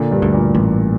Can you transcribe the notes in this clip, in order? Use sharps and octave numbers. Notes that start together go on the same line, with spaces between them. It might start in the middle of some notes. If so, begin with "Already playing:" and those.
Already playing: A#2 D3 A#3
G2 G3
D2
A#2 A#3
A1